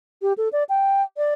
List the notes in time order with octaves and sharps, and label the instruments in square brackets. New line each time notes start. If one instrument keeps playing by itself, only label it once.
[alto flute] G4
A4
D5
G5
D5